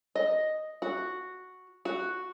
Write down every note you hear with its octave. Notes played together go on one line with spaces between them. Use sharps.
D#5
F#4
F#4